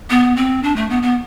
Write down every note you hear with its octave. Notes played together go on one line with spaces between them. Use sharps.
B3
C4
D4
A3
B3
B3